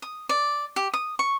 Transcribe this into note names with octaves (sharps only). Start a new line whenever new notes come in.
D#6
D5
G4
D#6
C#6